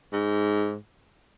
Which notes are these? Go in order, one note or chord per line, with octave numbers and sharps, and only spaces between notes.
G#2